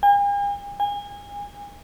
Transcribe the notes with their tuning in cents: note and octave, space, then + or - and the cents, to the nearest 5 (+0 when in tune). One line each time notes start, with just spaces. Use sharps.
G#5 -45
G#5 -30